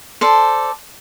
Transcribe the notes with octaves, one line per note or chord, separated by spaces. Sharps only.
A4 C5 D5